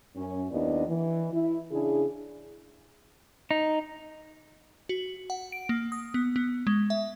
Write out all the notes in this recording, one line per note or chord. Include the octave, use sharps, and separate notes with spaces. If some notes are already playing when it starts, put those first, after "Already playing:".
F#2 C#4
D#2 B3 D4 E4 D5 D#5
E3
E4
C#3 D4 E4 G#4
D#4
F#4
F#5
D7
A#3
D#6
B3
B3
G#3
E5